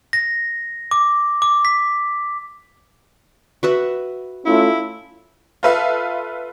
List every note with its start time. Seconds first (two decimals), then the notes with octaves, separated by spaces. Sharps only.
0.13 A#6
0.91 D6
1.42 D6
1.65 B6
3.63 F#4 B4 E5
4.45 A3 C#4 E4 F4
5.63 F4 A4 B4 E5 F5